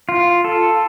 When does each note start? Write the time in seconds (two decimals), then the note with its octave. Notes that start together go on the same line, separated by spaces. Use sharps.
0.09 F4
0.44 A4